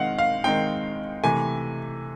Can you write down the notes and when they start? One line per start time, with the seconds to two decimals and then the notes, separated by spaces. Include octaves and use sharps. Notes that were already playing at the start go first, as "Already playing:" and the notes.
Already playing: D#3 G#3 C4 D#4 F5 F#5
0.19 F5
0.44 D#3 G#3 C4 D#4 G5
1.24 C3 E3 A3 G#5